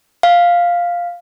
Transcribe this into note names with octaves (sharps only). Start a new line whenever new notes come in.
F5